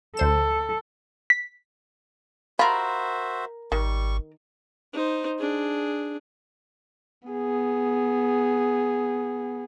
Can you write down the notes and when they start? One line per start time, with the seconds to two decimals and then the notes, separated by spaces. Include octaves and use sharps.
0.17 D2 A4 C5 E7
1.30 B6
2.59 F4 F#4 A#4 C5 E5 B5
3.72 G#1 D#3 G3 C#6
4.93 D#4 C5
5.39 D4 G#4
7.28 B3 G#4